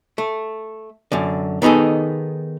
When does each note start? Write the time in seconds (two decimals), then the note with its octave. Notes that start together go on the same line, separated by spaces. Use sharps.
0.18 A3
1.12 F#2 D3
1.62 D#3 B3 D#4 G#4 A4